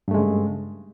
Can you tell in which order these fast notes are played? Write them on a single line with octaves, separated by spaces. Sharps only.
G2 A3 G#3 C#3